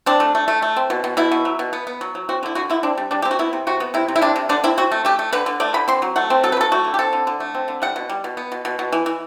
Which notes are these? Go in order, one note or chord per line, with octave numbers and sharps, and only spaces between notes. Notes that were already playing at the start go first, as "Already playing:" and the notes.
C4 D4
A3
A3
A3
A3
C4
B2
B2
B2 E4
B2
F#3
B2
B3
B3
F#3
F#3
C4 F#4
D3 E4
D3 F#4
D3 E4
C4 D4
G3
G3 D4
C4 G4
F#4
B3 E4
C3
C3 F#4
B3
C3 E4
C3
E4
C3 D4
C3
D3 D4
C4 E4
C4 F#4
A3
A3 G4
A3
D3 B4
D3
A3 D5
D3 B5
C4 C6
F#3
A3 F#5
C4
F#3 A4
B4
F#3 A4
A3 F#4
D3
G4
C4 A4
D3
D3
A3
C4
D3
G3 F#5
B2
G3
B2
B3
B2
B2
B2
E3
E3